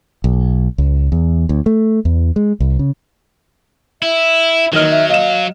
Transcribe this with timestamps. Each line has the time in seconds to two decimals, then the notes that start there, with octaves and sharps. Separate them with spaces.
0.24 B1
0.78 C#2
1.12 E2
1.49 D2
1.66 A3
2.05 E2
2.36 G#3
2.60 C2
2.79 C#3
4.02 E4 E5
4.73 D#3 E3 F#3 D#5 F6
4.90 E5
5.09 D#5 F5 E7